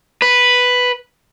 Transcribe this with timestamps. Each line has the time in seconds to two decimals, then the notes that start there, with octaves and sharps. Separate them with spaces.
0.22 B4